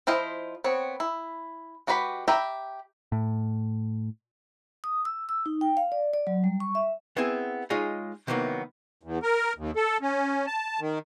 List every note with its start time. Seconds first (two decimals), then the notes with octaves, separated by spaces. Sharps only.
0.07 F3 E4 F4 C5 D#5
0.64 B3 C4 C#5
1.00 E4
1.87 G#3 F#4 G4 B4 B5
2.28 G4 E5 G5 A#5 B5
3.12 A2
4.84 D#6
5.05 E6
5.29 E6
5.46 D#4
5.61 G5
5.77 F5
5.92 D5
6.14 D5
6.27 F#3
6.44 G3
6.60 C#6
6.75 E5
7.17 B3 C4 E4 G#4 G#5
7.70 G#3 D#4 F4 G#4 C#5 D#5
8.27 C3 D#3 E3 F#3 A#3 B3
9.03 E2
9.23 A#4
9.58 D#2
9.76 A4
10.01 C#4
10.47 A5
10.80 D#3